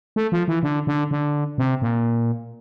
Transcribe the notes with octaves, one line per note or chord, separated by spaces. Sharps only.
A3
F3
E3
D3
D3
D3
C3
A#2